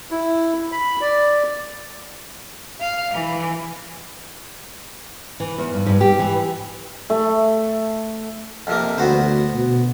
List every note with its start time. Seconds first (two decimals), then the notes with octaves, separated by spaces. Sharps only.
0.11 E4
0.72 B5
1.01 D5
2.80 F5
3.14 E3
5.40 E3
5.58 E2
5.74 G2
5.86 G2
6.01 G4
6.19 E3
7.10 A3
8.67 F2 C3 A#3
8.98 D2 B3 F#4 C5
9.53 B2